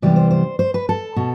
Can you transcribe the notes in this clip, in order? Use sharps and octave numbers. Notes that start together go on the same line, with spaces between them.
C3 E3 G3 B3 D5
C5
C5
C5
B4
A4
B2